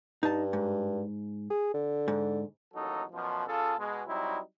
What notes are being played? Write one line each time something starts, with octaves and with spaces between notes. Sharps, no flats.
G2 D#4 A5
G#2
G#4
D3
G#2
A1 D#2 F#3 D#4 A4
F#2 B2 F3
C#3 F4 G#4 A4
B2 G#3
F#3 G3 C4 D#4 E4